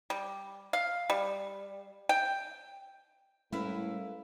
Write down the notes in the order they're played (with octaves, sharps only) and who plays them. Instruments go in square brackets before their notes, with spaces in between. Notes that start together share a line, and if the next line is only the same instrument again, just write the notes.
[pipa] G3
F5
G3
G5
[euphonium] A2 [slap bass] G3 G#3 C#4 [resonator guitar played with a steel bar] E4 [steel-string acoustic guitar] A#4 B4 F5